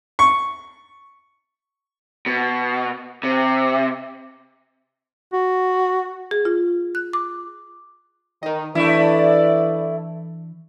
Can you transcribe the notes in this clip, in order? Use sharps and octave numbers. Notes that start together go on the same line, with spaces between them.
C#6
B2
C3
F#4
G#4
F4
F#6
D6
D#3 A#4 D#5
E3 A3 D4 E4 B4 D5 B5